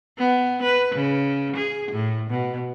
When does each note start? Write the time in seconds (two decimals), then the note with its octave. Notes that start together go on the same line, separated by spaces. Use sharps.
0.18 B3
0.62 B4
0.95 C#3
1.56 G#4
1.91 A2
2.30 B2